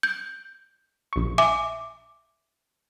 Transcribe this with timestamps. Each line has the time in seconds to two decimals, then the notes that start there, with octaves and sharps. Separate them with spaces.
0.03 G6
1.13 A#1 C#6
1.38 E5 G#5 D6